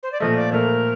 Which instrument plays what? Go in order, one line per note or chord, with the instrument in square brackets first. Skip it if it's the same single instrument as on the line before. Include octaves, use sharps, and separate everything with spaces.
[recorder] C5
D5
[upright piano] A#2 F3 A3 [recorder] D#5
[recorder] D5
[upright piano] A#2 F3 A3 [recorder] A#4